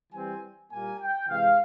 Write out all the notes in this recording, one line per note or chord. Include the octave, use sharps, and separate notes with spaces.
E3 G3 C4 G#5
A#2 G3 A#3 G#5
G5
C3 E3 G#3 F5